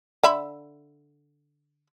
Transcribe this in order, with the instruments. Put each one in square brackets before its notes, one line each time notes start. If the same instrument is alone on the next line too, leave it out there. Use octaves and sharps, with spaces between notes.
[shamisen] D3 E5 B5